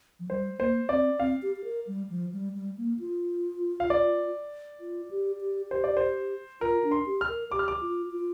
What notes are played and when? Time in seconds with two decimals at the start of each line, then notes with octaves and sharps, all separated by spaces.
0.20 F3
0.29 G3 C5
0.59 A#3 C5
0.89 C4 D5
1.20 C4 F5
1.42 G4
1.56 G4
1.64 A#4
1.87 G3
2.10 F3
2.33 G3
2.54 G3
2.78 A#3
3.00 F4
3.80 F5
3.90 D5
4.80 F4
5.11 G4
5.41 G4
5.71 G4 C5
5.84 D5
5.97 C5
6.61 F4 A#4
6.84 D4
6.91 C6
7.06 G4
7.21 F6
7.29 A#4
7.52 G4 D6
7.59 F6
7.68 D6
7.81 F4
8.12 F4